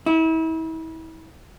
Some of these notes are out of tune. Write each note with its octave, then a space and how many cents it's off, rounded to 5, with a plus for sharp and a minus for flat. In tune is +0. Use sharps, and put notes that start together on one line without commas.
E4 -35